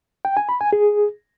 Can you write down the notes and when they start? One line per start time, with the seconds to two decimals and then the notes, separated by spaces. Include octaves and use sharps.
0.25 G5
0.37 G#5
0.49 B5
0.61 G#5
0.73 G#4